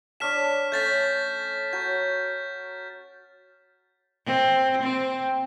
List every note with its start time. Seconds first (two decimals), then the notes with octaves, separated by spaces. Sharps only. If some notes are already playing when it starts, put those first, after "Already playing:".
0.20 D4 C#5 A5 F6 B6 E7
0.72 A3 C#4 G6 A6 B6
1.73 F#4 A#4 C#5 G6
4.27 C4
4.82 C4